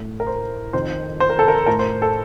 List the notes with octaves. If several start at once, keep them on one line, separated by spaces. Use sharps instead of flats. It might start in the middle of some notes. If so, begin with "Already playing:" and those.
Already playing: A2
A#4
C5
F2 D#3 C5
C5
A#4
A4
A#4
A2 A#4
C5
A4